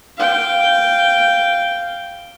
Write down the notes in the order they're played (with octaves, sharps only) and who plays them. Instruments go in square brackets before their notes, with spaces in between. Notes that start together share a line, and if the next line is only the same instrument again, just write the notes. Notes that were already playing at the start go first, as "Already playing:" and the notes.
[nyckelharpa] F5 G5